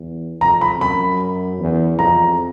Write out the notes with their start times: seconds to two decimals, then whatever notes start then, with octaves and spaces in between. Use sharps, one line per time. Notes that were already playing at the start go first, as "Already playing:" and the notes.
Already playing: E2
0.41 F2 A#5
0.61 B5
0.80 F#2 B5
1.59 E2
1.99 F2 A#5